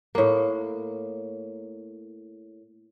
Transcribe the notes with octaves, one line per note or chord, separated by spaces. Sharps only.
A2 A#3